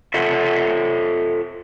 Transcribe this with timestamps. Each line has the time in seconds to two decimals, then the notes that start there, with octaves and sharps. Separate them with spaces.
0.14 F4 A4 E5 F#5